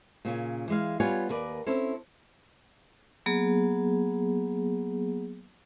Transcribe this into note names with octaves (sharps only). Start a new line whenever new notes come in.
A#2 C#3 C#4
E3 G#3 F5
G3 B3 F4 C#5 G#5
D#2 A#4 B4 D5
C4 C#4 E4 A4
F#3 A#3 B3 G#4